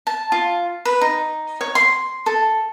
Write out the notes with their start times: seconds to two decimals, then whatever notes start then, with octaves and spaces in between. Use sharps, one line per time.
0.07 A5
0.32 F4
0.85 B4
1.01 D#4
1.61 C#5
1.75 C6
2.26 A4